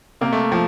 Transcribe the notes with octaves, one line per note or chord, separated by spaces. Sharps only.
C3 A#3
A3
F3